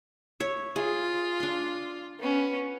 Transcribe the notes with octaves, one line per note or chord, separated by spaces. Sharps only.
C#5 E5
F4 G#4
D4 C6
B3 C#4